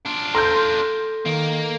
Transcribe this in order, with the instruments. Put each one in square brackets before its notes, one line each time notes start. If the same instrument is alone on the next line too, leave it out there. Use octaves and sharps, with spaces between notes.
[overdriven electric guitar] D4 F4
[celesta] A4 A#6 [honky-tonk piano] C6 F6 G6
[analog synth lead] D#3 [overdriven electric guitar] A#3